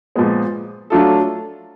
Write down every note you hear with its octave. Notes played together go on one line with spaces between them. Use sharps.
A#2 F3 G#3 B3
F#3 A3 D4 F4 A4